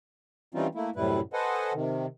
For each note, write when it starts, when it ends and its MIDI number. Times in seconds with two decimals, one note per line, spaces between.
0.55 0.67 52
0.55 0.67 55
0.55 0.67 60
0.55 0.67 61
0.55 0.67 63
0.55 0.67 65
0.75 0.90 57
0.75 0.90 58
0.75 0.90 64
0.96 1.20 42
0.96 1.20 45
0.96 1.20 48
0.96 1.20 55
0.96 1.20 64
0.96 1.20 71
1.33 1.73 69
1.33 1.73 71
1.33 1.73 72
1.33 1.73 75
1.33 1.73 78
1.33 1.73 80
1.74 2.06 48
1.74 2.06 51